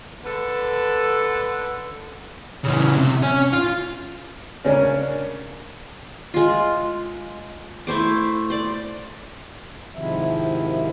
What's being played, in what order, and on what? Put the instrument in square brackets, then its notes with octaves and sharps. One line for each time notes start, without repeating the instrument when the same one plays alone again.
[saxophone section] D3 A4 B4
[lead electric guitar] C#3 E3
C3
C#4
F4
[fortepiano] C#3 C#4 D4 A#4
[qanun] G#3 F4
A3 E4 C5 D6
C5 D5
[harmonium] G#2 C3 D#3 F3 E4 E5